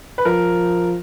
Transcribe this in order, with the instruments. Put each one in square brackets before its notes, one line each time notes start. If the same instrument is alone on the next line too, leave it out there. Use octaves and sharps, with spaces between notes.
[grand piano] B4
[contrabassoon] F3 [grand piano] A#4